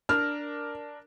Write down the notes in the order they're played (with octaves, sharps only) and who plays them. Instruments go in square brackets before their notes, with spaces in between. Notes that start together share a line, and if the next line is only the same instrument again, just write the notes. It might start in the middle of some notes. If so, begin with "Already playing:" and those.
[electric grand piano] D4 A#4 D5 [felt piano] F6